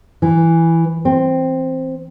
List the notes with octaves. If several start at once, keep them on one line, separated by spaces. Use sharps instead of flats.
E3
C4